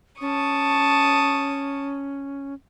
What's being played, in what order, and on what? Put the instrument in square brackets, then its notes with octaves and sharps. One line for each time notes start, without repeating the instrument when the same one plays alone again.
[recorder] C#4 [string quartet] A5 C#6 D#6